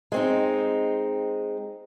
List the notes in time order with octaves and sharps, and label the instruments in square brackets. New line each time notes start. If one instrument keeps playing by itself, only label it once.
[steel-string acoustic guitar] G#3 C4 D#4